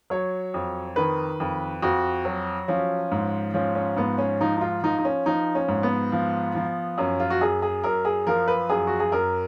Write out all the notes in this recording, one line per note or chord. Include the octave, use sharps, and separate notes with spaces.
F#3 C#5
F2
D#3 B4
F2
F2 F#4
F#3
F3 C#4
G#2
F3 C#4
C#4
G#2 B3
C#4
F3 D#4
D#4
F4
F3 D#4
D#4
C#4
F3 D#4
C#4
G#2
B3
F3
F3
F#2 C#4
F4
F#4
F#2 G#4
G#4
F#2 A#4
G#4
F3 A#4
B4
F#2 G#4
F#4
G#4
F#2 A#4